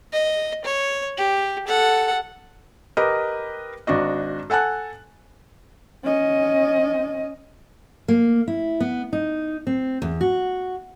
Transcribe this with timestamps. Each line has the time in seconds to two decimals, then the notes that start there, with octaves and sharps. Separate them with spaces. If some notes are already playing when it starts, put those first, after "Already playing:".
0.13 D#5
0.64 C#5
1.17 G4
1.67 A4 F#5
2.97 G4 A#4 B4 D#5
3.87 G#1 D4 F#4 D#5
4.50 A4 F#5 G#5 A5 F#6
6.03 C#4 D#5
8.08 A#3
8.48 E4
8.80 B3
9.13 D#4
9.67 C4
10.02 E2
10.21 F#4